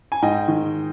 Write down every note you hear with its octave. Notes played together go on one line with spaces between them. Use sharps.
G#5
G#2 D#5 G5
D#3